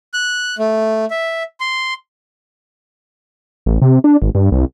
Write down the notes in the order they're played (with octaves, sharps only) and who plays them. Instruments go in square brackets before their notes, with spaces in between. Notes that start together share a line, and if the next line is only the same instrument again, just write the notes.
[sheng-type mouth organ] F#6
A3
E5
C6
[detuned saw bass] A1
C3
D4
G#1
G2
C2